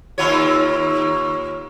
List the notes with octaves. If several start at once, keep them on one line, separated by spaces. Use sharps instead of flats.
D#2 F4 C#5